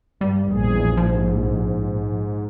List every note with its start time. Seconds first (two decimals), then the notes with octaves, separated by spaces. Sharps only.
0.21 G2 G3
0.52 A#1 E2 G#4
0.97 G#2 F3